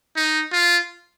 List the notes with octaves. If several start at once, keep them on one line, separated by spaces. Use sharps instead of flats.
D#4
F4